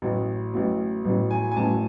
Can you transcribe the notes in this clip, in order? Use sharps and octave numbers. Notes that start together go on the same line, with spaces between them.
A1 A2 F#3
A1 A2 F#3
A1 A2 F#3
G#5
G#5
A1 A2 F#3 A5